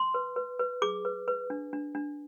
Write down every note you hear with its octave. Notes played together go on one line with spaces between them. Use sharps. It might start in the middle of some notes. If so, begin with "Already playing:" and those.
Already playing: C6
B4
B4
B4
G#4 D6
B4
B4
D4
D4
D4